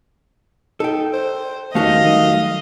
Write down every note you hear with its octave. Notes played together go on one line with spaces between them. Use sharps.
D#4 A4 G5
C5
E2 D#3 A3 C#4 F#4 G4 D#5 F5
D#3 F#3 G3